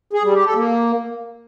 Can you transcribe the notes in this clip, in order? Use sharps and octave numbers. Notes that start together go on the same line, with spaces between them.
G#4
G3
G4
A4
A#3